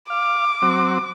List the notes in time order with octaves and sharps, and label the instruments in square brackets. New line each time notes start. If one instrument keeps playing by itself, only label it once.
[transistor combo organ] F5 [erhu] D6
[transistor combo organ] F#3 C4